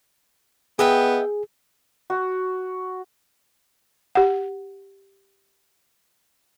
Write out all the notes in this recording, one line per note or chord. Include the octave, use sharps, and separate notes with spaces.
B3 G#4 D#5 E5 G5
F#4
G4 F#5